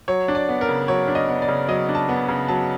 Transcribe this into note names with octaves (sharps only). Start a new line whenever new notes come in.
F#3 C#5
D4
D5
B3
A#4
C#3
F#3 C#5
D4
D#5
B3
D5
C#3
F#3 D#5
D4
A5
B3
C#3
F#3 A5